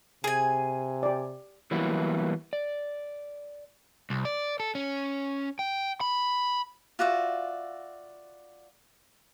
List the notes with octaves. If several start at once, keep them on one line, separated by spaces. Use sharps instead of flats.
C3 G#4 G#5
G4 D5
E3 F#3 G3 A#3 B3 E4
D5
C2
D5
A4
C#4
G5
B5
F4 F#4 D5 E5